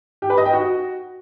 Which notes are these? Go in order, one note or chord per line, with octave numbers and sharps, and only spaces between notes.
G4
B4
D#5
G5
F#4